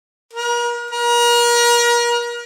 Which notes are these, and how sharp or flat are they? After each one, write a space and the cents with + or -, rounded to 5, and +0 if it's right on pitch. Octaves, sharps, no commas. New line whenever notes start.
A#4 +40
A#4 +35